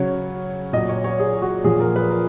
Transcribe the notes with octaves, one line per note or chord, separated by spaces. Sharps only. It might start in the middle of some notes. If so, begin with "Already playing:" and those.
Already playing: C#3 F#3 C#5
A#2 F#3 D#5
C#5
C#5
G#4
F#4
A#2 F3 G#4
A#4
B4
A#4